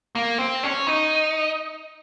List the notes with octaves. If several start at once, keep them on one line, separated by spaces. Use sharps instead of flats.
A#3
C4
C#4
D#4